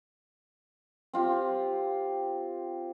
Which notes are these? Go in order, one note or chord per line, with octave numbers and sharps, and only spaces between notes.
C4 F4 G4